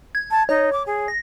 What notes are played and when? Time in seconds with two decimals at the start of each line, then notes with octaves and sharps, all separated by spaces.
0.15 G#6
0.31 A5
0.49 D#4 C#5
0.72 D6
0.86 G#4
1.08 A#6